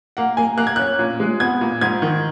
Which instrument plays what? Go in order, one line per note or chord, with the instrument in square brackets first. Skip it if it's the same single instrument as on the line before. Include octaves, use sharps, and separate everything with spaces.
[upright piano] A#3 F#5
A#3 G#5
A#3 F#6
G#6
C#4 F#6
A#2
G#3
B3 G#6
A#2
G#2 G#6
D#3